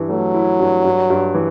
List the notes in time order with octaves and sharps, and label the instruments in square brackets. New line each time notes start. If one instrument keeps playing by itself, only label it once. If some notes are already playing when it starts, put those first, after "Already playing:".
Already playing: [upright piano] G2 E3 E4
[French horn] F#3 [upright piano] A3
[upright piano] E4
G2
G2
G2
E3